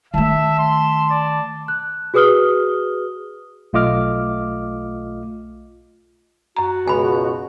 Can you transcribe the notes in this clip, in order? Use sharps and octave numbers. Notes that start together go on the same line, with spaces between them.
D#3 A3 E5 A5
C6
D5
F#6
F#4 G#4 B4 D#6 F6 G7
B1 A3 F4 D#5 D6 F6
F#2 F#4 A#5
C#2 B2 G#5 B5